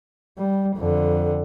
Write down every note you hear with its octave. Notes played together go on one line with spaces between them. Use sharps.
G3
F2 D3